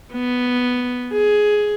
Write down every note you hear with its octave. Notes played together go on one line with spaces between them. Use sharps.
B3
G#4